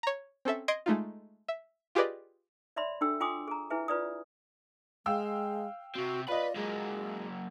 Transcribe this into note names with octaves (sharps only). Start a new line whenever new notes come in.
C#5 A#5
C4 C#4 A4 E5
D#5 C6 G#6 C7 D7
G#3 A3 D#4 F4
E5
F4 G4 G#4 B4 D5 D#5
C#5 D5 E5 B5 C6
D4 F#4 A4 G5 E6
F4 G5 G#5 C6 D6 D#6
G#4 A#5
E4 G#4 B4 E5 G#5
F4 B4 D5 D#6
G#3 F5 G5 E6
C3 C4 F#4
F4 B4 D5 D#5 B5
F#3 G#3 A#3